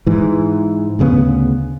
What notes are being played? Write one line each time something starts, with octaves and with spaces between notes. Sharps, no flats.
G#2 E3
D2 C#3 G3 B3